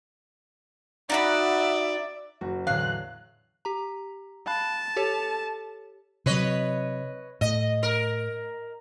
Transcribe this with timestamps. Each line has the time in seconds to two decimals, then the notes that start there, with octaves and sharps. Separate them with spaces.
1.10 D#4 F#4 D5 E5 B5
2.41 F#1 F#4
2.67 E2 A2 D3 F#3 F5 F#6
3.65 G4 A#5
4.47 F5 A5 B5 F#6
4.96 G4 A4 C#5
6.26 C3 F#3 B4 C#5 D#5
7.41 A2 D#5
7.83 A#4